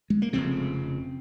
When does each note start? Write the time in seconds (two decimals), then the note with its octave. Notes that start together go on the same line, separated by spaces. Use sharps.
0.10 G#3
0.22 A#3
0.33 F1 F2 C#3 C4